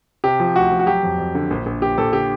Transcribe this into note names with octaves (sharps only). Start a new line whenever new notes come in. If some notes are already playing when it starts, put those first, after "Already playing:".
C3 G4
F3
D2 F#4
F3
F#4
F#3 G4
F2
F2
D3
A#1
A#1
A#1 G4
A#1 A4
D3 G4